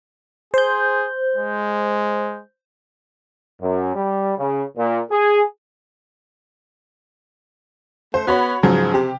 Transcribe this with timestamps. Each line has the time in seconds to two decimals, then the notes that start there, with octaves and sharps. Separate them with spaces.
0.54 G#4 C5 G6
1.36 G#3
3.61 F#2
3.95 G3
4.38 C#3
4.77 A#2
5.10 G#4
8.14 A3 C5
8.27 B3 F#4 C#5 B5
8.63 G#2 C#3 F3 F#3
8.94 C3 G4